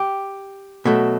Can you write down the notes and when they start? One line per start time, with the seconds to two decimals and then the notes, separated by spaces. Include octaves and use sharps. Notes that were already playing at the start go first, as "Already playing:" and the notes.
Already playing: G4
0.85 B2 F#3 A3